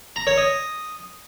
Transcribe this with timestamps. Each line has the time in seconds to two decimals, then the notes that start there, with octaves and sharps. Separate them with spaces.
0.16 A#5
0.27 C#5
0.37 D#5